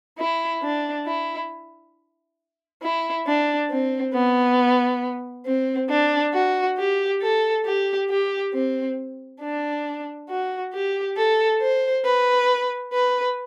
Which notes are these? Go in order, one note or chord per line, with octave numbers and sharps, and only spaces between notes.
E4
D4
E4
E4
D4
C4
B3
C4
D4
F#4
G4
A4
G4
G4
C4
D4
F#4
G4
A4
C5
B4
B4